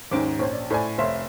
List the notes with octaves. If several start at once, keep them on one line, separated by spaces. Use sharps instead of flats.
D#2 G#2 C#4 C5 D6
A#1 C5 C#5
D5
A2 A4 C5 D5 G#5
F1 C5 C#5 E5 F5 C6